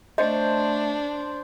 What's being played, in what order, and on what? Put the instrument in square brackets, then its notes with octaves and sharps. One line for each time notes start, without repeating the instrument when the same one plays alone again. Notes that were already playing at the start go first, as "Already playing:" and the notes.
[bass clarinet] A3 [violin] D4 [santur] C5 [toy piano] D#5